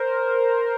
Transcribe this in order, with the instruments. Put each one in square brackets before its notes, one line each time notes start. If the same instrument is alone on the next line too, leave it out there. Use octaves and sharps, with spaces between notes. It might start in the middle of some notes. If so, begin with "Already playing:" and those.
Already playing: [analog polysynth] A#4 C5